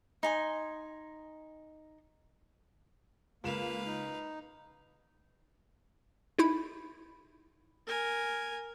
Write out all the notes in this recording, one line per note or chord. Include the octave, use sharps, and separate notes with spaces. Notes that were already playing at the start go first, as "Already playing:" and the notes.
D#4 G#5 C6
C#2 A#3 B4 F5 E7
D#4
D#4 E4 B5
A#4 G#5